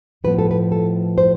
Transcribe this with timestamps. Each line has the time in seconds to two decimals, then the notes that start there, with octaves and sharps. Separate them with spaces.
0.24 A2 F3 B3 B4
0.39 A4
0.51 B4
0.72 A4
1.18 C5